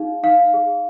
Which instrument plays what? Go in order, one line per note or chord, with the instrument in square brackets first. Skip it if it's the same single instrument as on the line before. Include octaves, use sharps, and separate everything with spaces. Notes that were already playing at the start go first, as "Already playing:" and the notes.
Already playing: [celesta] D#4 G#4 F5
D#4 F5
G#4